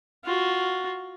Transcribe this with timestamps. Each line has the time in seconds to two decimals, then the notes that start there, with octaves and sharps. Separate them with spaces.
0.25 F4 F#4